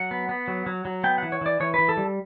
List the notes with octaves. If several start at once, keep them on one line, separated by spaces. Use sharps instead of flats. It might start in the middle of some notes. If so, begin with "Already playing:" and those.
Already playing: F#3 F#5
B3
B3
F#3
F#3
F#3
B3 G5
E3 F#5
C#5
E3 D5
E3 C#5
E3 B4
A4
G3